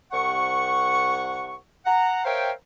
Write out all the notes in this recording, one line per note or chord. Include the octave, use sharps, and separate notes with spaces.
C2 F#5 C#6
F#5 A#5
A#4 C5 C#5 E5 F5 G5